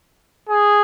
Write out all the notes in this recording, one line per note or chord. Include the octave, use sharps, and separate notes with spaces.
G#4